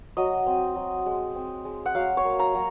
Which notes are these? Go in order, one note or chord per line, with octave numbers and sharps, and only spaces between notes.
F#3 D#5
C4
F#3
G#3
C4
G#3
F#5
F#3 F5
C#5
A#3
A#5
F#3